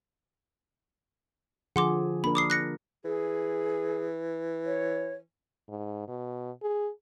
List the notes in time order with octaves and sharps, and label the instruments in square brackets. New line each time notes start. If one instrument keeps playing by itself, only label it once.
[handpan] D3 F3 G#4 [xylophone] F#5 C6 D6
[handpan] A#3 D4 A#4 [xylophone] B5
[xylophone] D6 D#6 C7
F#6 A#6 C#7
[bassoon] E3 [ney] G#4
[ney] C#5
[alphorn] G#2
B2
G#4